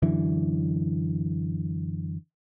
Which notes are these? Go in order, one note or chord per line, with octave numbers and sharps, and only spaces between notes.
F#2 D3 E3